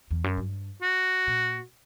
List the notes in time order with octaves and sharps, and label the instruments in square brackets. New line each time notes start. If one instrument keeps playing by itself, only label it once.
[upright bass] E2
F#2
G2
[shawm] F#4
[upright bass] A#2